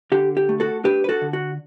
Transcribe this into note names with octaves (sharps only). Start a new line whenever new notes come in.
D3 G4
G4
A3
F#4 A4
D4 G4 B4
B4
F#4 A4
D3
F#4